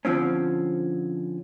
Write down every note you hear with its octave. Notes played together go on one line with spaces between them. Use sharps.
D3 F3 C4 C#4